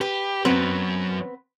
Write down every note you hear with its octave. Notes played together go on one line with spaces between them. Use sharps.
G4 B4
F#2 F#3 B3 C4 B4